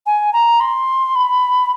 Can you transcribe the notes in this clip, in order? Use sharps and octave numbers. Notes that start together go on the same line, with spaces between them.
G#5
A#5
C6
B5